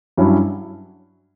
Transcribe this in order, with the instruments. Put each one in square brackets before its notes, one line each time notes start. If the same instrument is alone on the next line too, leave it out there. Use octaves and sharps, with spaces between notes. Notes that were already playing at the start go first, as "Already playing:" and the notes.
[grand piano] G2 F#3 C#4 E4